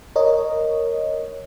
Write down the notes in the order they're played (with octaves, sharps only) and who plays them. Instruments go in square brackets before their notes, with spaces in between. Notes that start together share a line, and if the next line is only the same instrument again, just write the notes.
[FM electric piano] A#4 C#5 D#5